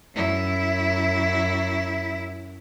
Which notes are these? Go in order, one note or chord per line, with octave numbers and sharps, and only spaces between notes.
F#2 E4